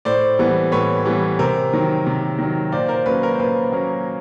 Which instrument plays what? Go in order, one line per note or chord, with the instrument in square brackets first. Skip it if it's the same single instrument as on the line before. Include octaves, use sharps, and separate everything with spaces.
[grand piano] A2 C5 D5
E3 G3 B3
A2 B4 C#5
E3 G3 B3
C3 A#4 C5
D#3 F#3
C3
D#3 F#3
A#2 C5 D5
A#4 C5
F#3 A#3 C#4 B4
A#4
C5
A#2 B4
F#3 A#3 C#4